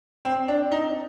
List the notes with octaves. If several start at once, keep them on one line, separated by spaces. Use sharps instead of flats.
C4
D4
D#4